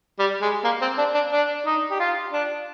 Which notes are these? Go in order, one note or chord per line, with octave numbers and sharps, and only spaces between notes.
G3
G#3
A#3
C4
D4
D4
D4
D#4
G4
F4
D4